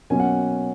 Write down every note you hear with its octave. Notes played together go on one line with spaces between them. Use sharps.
B2 F#3 A#3 C#4 G#5
F#5